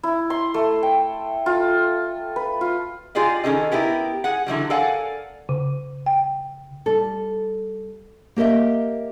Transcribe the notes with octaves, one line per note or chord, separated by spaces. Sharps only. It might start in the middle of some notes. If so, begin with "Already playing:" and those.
E4
C6
A3
G5
F4
B4
F4
F4 G4 G#4 D5 D#5
D#3 G3 C#4 G#4 A4 D#5
B3 E4 G4 A#4
G#4 F#5
D3 E3 F#3 G3
A4 A#4 D5 F5 F#5 G#5
C#3
G5
G3 A4
A#3 G4 A#4 D#5 E5